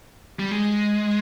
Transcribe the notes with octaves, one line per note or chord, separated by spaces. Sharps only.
G3
G#3